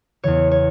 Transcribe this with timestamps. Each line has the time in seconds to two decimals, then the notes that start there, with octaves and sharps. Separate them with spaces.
0.24 E2 C#3 E3 C#5
0.51 C#5